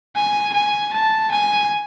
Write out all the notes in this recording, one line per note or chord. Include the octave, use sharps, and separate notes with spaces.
G#5
G#5
A5
G#5